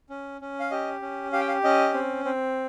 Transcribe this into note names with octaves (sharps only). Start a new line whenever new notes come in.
C#4
C#4
F5
G4 D#5
C#4
G4 F5
G5
F5
C#4 D#5
C4
C4